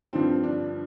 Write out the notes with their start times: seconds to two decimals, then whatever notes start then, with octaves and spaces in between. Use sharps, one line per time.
0.13 G2 D3 F3 C4
0.43 D4